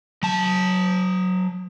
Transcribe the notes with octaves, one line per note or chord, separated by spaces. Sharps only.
F#3 A5